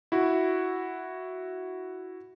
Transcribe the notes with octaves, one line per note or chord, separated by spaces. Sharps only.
E4 F#4